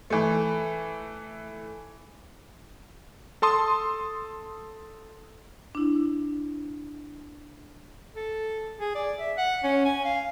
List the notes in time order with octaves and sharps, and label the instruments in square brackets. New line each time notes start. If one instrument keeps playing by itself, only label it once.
[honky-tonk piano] E3 A3
[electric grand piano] A4 A5 C6 D#6
[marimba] D4 E4
[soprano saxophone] A4
G#4
D5
E5
F#5
C#4
G#5
F5